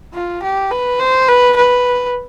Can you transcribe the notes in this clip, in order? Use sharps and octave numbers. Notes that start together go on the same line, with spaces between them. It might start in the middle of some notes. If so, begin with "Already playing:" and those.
F4
G4
B4
C5
B4
B4